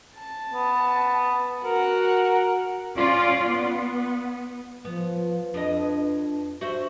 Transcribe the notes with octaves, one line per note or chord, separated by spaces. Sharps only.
A5
B3
F#4 A#4 F#5
C#4 F4 D5
B3
F3 B3
F2 D4 B4 D#5
F#4 C5 E5